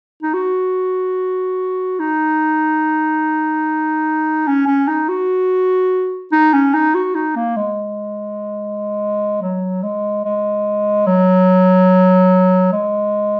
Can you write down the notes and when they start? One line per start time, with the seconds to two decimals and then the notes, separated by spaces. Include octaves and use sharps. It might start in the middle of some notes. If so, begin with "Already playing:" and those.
0.23 D#4
0.34 F#4
1.99 D#4
4.47 C#4
4.67 C#4
4.88 D#4
5.09 F#4
6.32 D#4
6.53 C#4
6.74 D#4
6.95 F#4
7.15 D#4
7.36 A#3
7.57 G#3
9.42 F#3
9.83 G#3
10.25 G#3
11.07 F#3
12.72 G#3